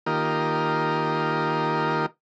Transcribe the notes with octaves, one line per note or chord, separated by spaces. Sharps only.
D#3 A#3 F4 G4 A#4 D#5